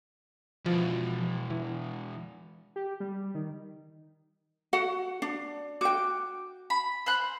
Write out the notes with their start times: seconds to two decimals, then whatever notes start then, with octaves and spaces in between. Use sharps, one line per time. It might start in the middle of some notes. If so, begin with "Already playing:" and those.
0.66 E2 B2 F3
1.50 E3
2.76 G4
3.00 G3
3.35 D#3
4.73 F#4 F#5
5.22 D4
5.81 F#4 G5 D6
6.70 B5
7.06 C5 B5 F#6